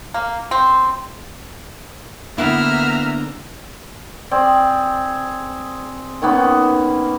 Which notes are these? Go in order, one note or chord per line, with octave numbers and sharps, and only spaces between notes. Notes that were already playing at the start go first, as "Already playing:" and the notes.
A#3
C4
D3 A#3 B3 E4 E5 A#5 F6
C4 G#4 D5
D#3 A#3 B3 C#4